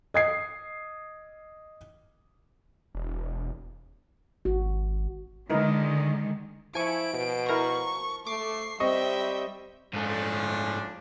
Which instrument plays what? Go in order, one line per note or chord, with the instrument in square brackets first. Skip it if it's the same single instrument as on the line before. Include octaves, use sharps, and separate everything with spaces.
[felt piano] D#5 G#6 C7
[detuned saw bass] E1
[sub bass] G#1 [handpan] F#4
[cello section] D3 D#3 G#3 [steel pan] D#4 E4 A#4
[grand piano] F3 [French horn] E4 [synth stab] G#5 C#6 [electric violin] D7
[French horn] B2
[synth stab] E4 A#4 A#5 [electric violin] C#6
[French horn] A3 [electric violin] C#6 C7 [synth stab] D6
[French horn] G3 [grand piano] C4 D#5 C#6 [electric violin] E5 G5
[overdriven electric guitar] G#2 A3 [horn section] F3 C#4 D4